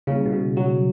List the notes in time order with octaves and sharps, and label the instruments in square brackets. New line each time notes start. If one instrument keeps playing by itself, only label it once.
[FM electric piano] C#3 [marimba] G3 A#3 C#4 E4
[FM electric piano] B2
C#3
F#3